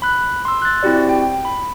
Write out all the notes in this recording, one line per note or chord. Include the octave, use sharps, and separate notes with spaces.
B5 F#6
C6 E6
F#6 A6
C4 E4 F#4 G4 D5
G5
B5